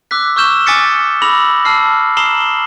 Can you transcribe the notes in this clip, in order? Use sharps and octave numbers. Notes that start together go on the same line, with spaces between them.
D6 E6 F#6 B6
C#6 E6 F6 G6 E7 G7
G#5 D6 D#6 A6 B6 C#7
B5 D6 E6 A#6 F7 F#7
A5 E6 F6 C7
A#5 D#6 C7 E7 F#7 G7